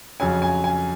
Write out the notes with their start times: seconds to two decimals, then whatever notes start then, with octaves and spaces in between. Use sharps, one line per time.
0.20 F2 C#3 F#3 C#4 G#5
0.42 G#5
0.64 G#5